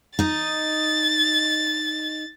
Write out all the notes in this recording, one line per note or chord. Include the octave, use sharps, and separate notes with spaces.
D#4 D#5 A6